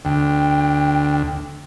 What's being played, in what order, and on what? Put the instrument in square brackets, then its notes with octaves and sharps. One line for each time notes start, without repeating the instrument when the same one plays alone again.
[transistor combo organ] D2 [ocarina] G5